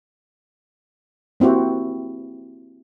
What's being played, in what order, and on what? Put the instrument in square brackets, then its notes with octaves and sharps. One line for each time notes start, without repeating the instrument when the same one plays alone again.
[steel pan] A#3 C4 E4 F#4 G4